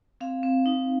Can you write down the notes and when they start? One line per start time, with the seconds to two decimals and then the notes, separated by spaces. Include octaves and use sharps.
0.21 C4 F5
0.43 C4
0.66 D#4